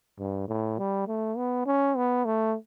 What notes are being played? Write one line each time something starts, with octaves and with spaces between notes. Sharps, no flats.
G2
A2
G3
A3
B3
C#4
B3
A3